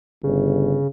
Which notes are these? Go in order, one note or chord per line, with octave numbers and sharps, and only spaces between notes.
G1 C#3